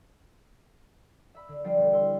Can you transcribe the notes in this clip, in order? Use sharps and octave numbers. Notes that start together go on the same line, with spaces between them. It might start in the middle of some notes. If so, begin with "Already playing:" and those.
E5 B5
D3
F3 G3 D4 F4 D5 C7
E1
E4 C6 F6